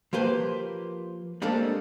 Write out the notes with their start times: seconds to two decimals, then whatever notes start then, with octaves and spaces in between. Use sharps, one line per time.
0.13 F3 A#3 G4 B4 C5
1.42 G3 G#3 A#3 C4 D4 A4